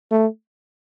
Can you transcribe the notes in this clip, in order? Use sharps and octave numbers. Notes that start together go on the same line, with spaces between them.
A3